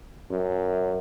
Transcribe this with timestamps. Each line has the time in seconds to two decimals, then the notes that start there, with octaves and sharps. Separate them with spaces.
0.31 F#2